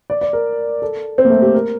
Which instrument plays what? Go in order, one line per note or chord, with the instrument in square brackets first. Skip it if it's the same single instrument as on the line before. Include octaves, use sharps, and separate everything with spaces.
[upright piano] D5
D5
A#4
A4
C4
A#3
A3
G4
A#4